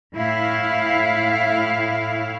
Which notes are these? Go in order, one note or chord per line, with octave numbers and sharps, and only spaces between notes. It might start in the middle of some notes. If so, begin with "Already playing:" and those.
A2 E4 F5